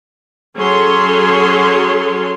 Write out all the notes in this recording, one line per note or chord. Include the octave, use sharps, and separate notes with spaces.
F#3 C#4 G#4 A4 C#5 C6